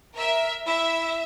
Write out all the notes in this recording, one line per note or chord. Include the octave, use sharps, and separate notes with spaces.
A#4 E5
E4 E5